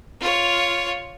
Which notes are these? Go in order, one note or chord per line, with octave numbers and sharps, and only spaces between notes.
F4 C#5